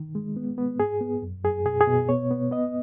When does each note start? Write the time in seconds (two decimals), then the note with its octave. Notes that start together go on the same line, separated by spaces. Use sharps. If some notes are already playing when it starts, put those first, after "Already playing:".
Already playing: D#3
0.15 G#3
0.36 B3
0.58 B3
0.79 G#2 G#4
1.01 B3
1.22 F#2
1.44 F#2 G#4
1.65 B2 G#4
1.81 G#4
1.87 B2
2.09 B3 C#5
2.30 B3
2.51 B3 D#5